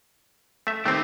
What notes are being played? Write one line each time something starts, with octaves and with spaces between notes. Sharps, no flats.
A3 E5
D#3 A3 C4 G4